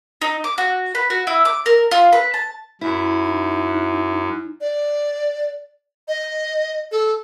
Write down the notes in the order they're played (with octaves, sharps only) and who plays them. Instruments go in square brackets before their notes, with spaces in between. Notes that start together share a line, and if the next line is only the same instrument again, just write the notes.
[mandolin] D#4
D6
F#4
B4
F#4
E4
D6
A#4
F4
B4
A5
[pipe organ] F#2 [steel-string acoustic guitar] E4
[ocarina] D#4
[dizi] D5
D#5
A4